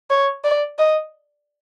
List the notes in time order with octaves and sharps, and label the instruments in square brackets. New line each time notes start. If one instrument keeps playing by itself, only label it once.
[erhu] C#5
D5
D#5